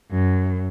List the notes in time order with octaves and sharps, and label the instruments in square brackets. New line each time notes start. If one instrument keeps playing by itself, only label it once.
[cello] F#2